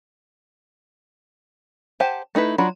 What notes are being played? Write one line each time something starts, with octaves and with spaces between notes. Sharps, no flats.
G4 C5 F#5 G#5 A5
A3 D#4 E4 B4
F#3 D4 F4 F#4 B5